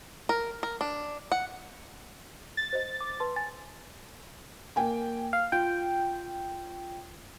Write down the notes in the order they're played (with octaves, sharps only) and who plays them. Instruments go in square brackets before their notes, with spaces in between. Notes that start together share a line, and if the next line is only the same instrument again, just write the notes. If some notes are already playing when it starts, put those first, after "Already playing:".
[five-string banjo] A#4
A#4
D4
F#5
[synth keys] A6
[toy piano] C5 D#5
[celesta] D6
B4 A5 C6
G#5 A6
[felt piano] A#3 G5 G#5
[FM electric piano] F5
[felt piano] F4 [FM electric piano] G5